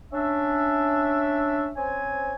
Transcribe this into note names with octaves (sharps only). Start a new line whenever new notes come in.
C#4 D4 E5
C4 C#4 C5 G#5